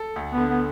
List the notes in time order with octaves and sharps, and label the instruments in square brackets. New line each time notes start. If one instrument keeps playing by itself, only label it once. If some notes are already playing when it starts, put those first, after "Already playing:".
Already playing: [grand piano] A4
D2
[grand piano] D3 [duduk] B3
[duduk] B3